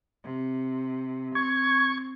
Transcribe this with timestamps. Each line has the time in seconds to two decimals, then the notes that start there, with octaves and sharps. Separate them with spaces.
0.24 C3
1.35 C4 C#6 G#6